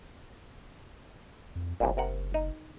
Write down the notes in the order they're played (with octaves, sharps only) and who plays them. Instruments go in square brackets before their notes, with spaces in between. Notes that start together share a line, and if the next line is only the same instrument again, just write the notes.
[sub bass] F2
[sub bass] F#1 [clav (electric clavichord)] C2 G2 A#2
[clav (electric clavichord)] C3 A#4 F#5
D#4